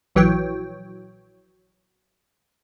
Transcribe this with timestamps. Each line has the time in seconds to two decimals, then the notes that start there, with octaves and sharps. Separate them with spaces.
0.15 A#1 E3 F#3 C#5 G5